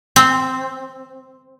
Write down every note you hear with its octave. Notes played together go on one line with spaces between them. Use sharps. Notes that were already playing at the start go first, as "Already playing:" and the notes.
C4